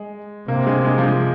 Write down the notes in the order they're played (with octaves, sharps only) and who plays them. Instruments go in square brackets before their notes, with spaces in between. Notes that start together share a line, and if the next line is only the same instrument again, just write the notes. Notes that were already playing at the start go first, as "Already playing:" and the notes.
Already playing: [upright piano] G#3
[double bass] C3 [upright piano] A#3
[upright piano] G#3
G#3
F3
G#3